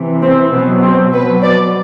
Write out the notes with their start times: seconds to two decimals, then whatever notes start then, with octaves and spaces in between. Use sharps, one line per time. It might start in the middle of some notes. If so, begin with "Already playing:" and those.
Already playing: C3 E3
0.22 C4
0.52 B2 F#3 B3
0.83 C4
1.13 B2 F#3 B4
1.43 D5